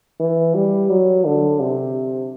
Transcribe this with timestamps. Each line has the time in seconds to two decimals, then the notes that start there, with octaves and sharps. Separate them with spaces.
0.20 E3
0.55 G3
0.90 F#3
1.25 D3
1.60 C3